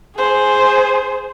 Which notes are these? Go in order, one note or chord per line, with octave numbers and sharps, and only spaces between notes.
G#4 C5